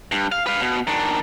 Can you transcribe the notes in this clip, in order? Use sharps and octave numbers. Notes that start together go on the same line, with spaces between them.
G2
F5
B4 F5
B2
D#3 D4